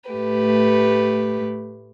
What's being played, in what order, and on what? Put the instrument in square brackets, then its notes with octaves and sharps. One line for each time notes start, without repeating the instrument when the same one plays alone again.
[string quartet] A2 A3 G4 B4